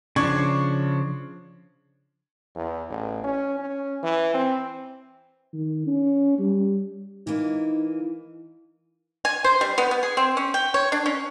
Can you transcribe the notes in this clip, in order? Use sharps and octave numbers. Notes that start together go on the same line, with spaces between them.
C#3 F3 D4 C#6 G#6
E2
A1
C#4
C#4
E3
C4
D#3
C#4
G3
E3 A#3 D#4
G#5
C5
G3
B3
B3
G#4
C4
C#4
G5
C#5
D4
C#4